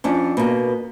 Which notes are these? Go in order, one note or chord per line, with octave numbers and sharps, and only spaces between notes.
F2 C#4 D4
B2 A#3